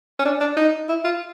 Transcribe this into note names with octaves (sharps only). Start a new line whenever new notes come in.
C#4
D4
D4
D#4
E4
F4